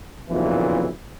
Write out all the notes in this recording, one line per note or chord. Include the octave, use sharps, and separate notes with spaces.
F#1 B1 F2 A#2 E3